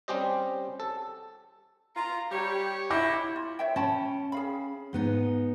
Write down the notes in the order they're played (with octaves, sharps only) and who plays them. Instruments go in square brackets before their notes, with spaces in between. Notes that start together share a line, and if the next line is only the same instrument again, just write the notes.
[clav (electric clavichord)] G3 C4 C#4 G4 C5 D#5
A4
[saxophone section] F4 [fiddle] A#5
[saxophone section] G3 G4 [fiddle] C#5
[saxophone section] E4 [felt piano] D6 G6 A#6
[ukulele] F4
C#5 E5 G5
[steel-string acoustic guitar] C#4 G5 [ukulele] C#5 A5 B5
[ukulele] G#4 F5 B5
[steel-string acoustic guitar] G#2 B3 D#4